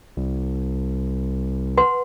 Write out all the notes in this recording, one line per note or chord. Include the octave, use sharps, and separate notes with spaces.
C2
B4 F#5 C6